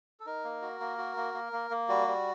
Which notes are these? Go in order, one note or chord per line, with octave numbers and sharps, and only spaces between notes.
A4
D#4 A#4
A#3
F#4
A#3
F#4
A#3
A#3
A#3
A#3
G3 F#4
G3